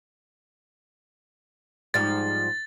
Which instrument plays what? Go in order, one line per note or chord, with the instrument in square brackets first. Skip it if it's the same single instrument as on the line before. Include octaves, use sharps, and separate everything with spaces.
[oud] G#2 F3 G3 [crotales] A6